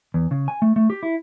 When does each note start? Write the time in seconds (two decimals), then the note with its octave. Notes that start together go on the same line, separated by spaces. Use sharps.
0.14 E2
0.31 C#3
0.48 G#5
0.62 A3
0.76 A3
0.90 G4
1.03 E4